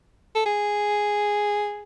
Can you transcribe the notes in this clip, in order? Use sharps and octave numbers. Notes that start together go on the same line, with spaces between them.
A4
G#4